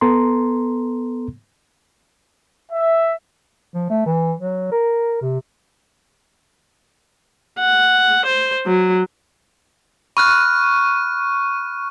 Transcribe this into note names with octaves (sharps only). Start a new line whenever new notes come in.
B3 A4 A#5 C6
E5
F3
A3
E3
F#3
A#4
C3
F#5
C5
F#3
B5 C#6 F6 F#6 D#7